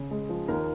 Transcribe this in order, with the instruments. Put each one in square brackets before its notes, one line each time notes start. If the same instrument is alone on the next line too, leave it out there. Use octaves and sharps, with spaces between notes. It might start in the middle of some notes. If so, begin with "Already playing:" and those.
Already playing: [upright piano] C#3
G#3
F3
D#2 A#4